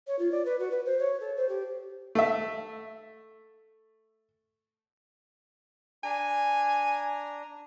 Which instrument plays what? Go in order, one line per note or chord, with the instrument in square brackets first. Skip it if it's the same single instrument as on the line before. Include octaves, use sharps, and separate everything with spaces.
[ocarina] C#5
F4
D5
B4
F#4
B4
C5
C#5
A4
C5
G4
[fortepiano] A3 E5
[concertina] D4 A#5 [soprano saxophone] G#5